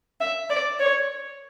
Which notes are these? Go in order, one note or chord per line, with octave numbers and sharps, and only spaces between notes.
E5
D5
C#5